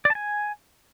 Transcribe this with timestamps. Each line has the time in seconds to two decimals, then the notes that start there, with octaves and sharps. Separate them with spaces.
0.05 D5
0.10 A5
0.15 G#5